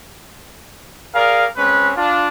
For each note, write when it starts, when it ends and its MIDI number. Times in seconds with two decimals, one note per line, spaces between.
1.15 1.45 68
1.15 1.45 70
1.15 1.45 74
1.15 1.45 77
1.57 1.91 56
1.57 1.91 60
1.57 1.91 61
1.57 1.91 71
1.96 2.28 62
1.96 2.28 65